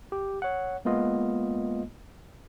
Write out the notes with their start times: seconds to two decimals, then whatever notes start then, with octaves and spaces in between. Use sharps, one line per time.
0.12 G4
0.42 C#5 F#5
0.85 G#3 A#3 B3 F4 D#5